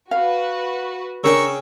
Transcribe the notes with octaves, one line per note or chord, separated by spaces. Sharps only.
F#4 B4 F5
C#3 D4 A#4 G5 C#6 E6